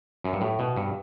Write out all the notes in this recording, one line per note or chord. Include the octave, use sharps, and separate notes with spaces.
F#2
G2
A2
B2
G2